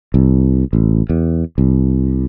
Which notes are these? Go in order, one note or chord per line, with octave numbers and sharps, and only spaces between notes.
C2
A1
E2
C2